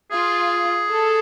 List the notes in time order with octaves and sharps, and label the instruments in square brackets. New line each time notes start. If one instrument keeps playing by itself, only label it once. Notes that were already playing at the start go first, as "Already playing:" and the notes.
[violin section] F4 [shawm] G#4
[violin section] A4